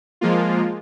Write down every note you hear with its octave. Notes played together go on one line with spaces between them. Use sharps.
F3 G#3 A#3 F4